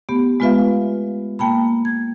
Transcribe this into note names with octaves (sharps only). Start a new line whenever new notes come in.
A3 B3 G4
G#3 B3 F4 B4 E5 F5
A#3 G5 A5 B5
G#6